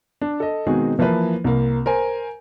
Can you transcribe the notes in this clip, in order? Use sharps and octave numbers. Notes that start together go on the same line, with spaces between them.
D4
A4 D#5
B2 D#3 G#3 C4 F#4 G#4
E3 F3 A#3 E4 B4
C2 A#3
A#4 C5 G#5